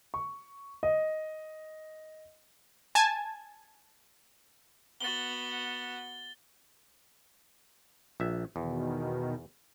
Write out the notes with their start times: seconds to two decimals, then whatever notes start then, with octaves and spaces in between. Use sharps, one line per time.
0.14 C#6
0.83 D#5
2.95 G#5 A5 G#6
5.01 B3 F#4 A6 G7
8.20 A#1 E5
8.56 E2 B2 D#3